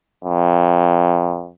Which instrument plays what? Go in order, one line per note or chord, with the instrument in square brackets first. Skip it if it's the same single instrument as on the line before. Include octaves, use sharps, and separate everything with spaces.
[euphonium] F2